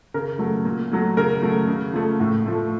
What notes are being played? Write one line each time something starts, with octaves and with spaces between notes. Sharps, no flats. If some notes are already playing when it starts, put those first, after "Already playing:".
C#3 A#4
F#3 A3
A#2
F#3 A3
C#3 A#4
F#3 A3
C#3
F3 A3
A2
F3 A3